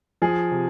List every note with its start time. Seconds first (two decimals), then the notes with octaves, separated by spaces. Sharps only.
0.22 F3 G#4
0.51 C3